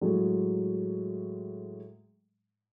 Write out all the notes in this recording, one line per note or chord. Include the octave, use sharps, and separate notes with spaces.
A2 F#3 G#3